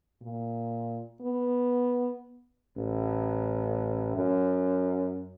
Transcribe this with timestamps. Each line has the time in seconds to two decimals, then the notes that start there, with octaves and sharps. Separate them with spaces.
0.22 A#2
1.21 B3
2.77 A1
4.16 F#2